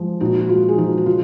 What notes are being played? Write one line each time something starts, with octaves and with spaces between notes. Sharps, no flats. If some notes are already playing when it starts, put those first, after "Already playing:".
Already playing: F3 G#3
A#2 D#4 F#4
F#4
G#3 F4
G#4
F3 D#4 F#4
F#4
C#3 F4